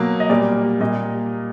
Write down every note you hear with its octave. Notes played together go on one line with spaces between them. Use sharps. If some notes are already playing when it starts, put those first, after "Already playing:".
Already playing: B2 F#3 A#3
D#5
A#2 G3 A#3 D5
A#2 G3 A#3 D#5